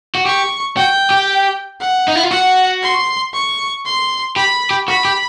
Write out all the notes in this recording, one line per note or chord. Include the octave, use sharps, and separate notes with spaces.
F#4
G4 C#6
F#4 G5
G4
F#5
D#4
E4
F4
F#4 F#5
C6
C#6
C6
G4 B5
G4
F#4 B5
G4